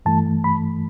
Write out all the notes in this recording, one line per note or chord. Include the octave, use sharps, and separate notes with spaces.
G2 E3 A3 A5
B5